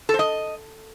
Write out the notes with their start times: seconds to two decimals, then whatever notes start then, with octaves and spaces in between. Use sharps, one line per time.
0.09 A4
0.14 C5
0.19 D#5